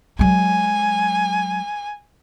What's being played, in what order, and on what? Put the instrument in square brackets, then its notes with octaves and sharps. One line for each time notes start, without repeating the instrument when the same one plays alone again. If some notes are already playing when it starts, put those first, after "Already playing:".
[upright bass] F#3 G#3 [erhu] G#5